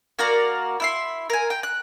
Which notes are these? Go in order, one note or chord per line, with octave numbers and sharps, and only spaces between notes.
A#3 F#4 A#4 D5
E4 E5 C6
A#4 G#5
G5
F#6